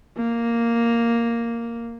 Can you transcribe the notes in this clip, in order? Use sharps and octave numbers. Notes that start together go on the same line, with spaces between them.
A#3